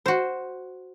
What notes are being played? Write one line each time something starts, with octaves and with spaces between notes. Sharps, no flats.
F#4 C5